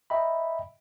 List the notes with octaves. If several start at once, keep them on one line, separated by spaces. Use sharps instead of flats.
D#5 E5 G5 A#5 B5